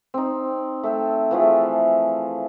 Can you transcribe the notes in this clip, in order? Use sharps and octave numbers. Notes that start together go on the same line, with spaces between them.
C4 D#4
A3 A4 G5
E3 F3 A3 G#4